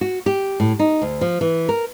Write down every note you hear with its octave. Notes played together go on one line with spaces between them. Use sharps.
F#4
G4
A2
D#4
D2
F3
E3
A#4